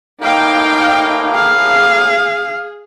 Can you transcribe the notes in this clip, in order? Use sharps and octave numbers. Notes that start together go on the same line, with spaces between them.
A1 A2 A#3 D#4 F5 G5
G#4 F5